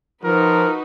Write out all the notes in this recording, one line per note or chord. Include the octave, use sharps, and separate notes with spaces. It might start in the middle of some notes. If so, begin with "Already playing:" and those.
F3 D#4 F#4 A#4 B4